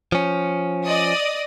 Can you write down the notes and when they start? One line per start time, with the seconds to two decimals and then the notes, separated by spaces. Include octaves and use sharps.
0.12 F3 C#4
0.85 D5 D#5 D#6